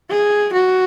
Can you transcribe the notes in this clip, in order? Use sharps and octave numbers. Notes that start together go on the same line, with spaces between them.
G#4
F#4